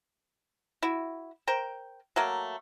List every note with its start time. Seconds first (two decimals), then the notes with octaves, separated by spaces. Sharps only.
0.83 E4 F#4
1.47 A#4 C5 G5
2.16 F#3 A3 A#3